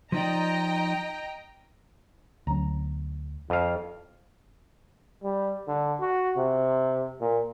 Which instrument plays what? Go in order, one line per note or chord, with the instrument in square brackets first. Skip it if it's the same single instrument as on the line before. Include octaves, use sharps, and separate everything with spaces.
[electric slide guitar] F3 D#4 D5 [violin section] D#5 G5 A#5
[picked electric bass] D2 F#3 C#4 [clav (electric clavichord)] A#5
[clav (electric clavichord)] F2 F5
[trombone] G3
D3
F#4
C3
A#2